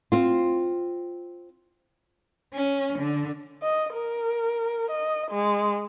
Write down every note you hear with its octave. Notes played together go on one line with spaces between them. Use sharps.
C4 F4
C#4
D3
D#5
A#4
D#5
G#3